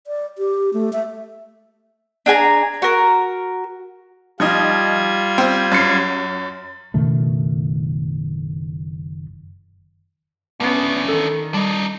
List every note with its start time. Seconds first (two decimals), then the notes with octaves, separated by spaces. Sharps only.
0.07 D5
0.38 G4
0.73 A3
0.93 E5
2.26 D4 G#4 G#5 A#5
2.82 F#4 A#4
4.40 F3 G3 D#4 F4 D#5 G#6
5.38 C4
5.72 F#2 C7
6.94 F#1 B2 D#3 A3
10.60 B3 C#4 D4 E4
11.08 D#3 A4
11.54 G3 D4 D#4